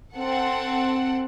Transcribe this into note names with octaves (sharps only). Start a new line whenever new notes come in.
C4 A4 F#5